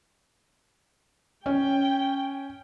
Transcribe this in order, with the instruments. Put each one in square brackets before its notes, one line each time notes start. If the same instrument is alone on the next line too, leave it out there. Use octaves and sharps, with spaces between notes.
[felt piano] C#4 [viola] G5